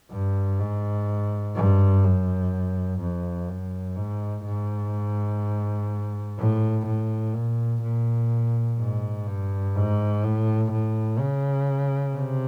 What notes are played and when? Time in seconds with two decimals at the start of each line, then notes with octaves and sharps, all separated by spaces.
0.11 G2
0.60 G#2
1.56 G2
2.04 F#2
3.01 F2
3.49 F#2
3.96 G#2
4.45 G#2
6.38 A2
6.86 A2
7.34 A#2
7.82 A#2
8.78 G#2
9.27 G2
9.76 G#2
10.24 A2
10.72 A2
11.20 C#3
12.15 C3